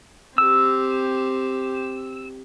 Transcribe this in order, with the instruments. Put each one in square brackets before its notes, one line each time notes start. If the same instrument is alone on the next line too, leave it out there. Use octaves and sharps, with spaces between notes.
[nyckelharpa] C4 G4 [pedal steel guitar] E6